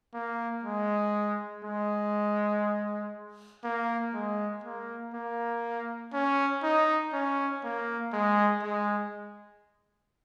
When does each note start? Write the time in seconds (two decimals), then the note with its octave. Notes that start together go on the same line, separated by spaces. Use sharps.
0.14 A#3
0.64 G#3
1.64 G#3
3.64 A#3
4.13 G#3
4.64 A#3
5.14 A#3
6.13 C#4
6.63 D#4
7.13 C#4
7.63 A#3
8.13 G#3
8.63 G#3